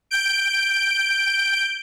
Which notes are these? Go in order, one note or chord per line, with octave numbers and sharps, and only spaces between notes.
G6 D7